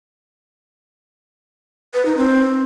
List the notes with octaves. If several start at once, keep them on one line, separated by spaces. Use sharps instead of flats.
B4
D#4
C4